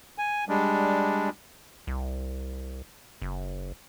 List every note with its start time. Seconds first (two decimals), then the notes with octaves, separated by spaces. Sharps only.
0.18 G#5
0.49 G3 G#3 D4
1.87 C2
3.22 F#1